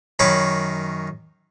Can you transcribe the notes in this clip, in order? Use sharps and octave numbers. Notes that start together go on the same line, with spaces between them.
F#2 D#3 C#5 B5 D6